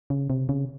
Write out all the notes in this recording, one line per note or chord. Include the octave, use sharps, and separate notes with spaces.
C#3
C3
C#3